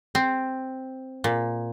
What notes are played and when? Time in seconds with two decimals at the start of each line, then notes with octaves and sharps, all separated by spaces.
0.15 C4
1.24 A#2